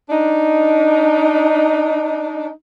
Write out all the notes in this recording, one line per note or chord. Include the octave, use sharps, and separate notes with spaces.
D4 D#4